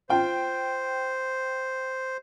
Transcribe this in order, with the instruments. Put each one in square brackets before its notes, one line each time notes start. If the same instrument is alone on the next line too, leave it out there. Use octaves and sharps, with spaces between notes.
[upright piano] F4 G5 [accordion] C5